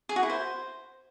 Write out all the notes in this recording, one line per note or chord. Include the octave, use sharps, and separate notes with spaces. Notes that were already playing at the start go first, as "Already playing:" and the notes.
G#4
F#4
E4
C5